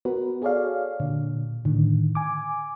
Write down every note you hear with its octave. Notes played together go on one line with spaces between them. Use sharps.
B3 F#4 A#4 B4
F#4 G#4 A4 C#5 D5 F5
A#2 D3
A2 D3 D#3
G#5 D6